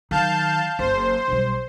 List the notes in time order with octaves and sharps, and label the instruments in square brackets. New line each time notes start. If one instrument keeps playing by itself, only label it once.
[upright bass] D#3 F#3 [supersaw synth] F5 A5 G6
[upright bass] F#1 [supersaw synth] C5
[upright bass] B1 G3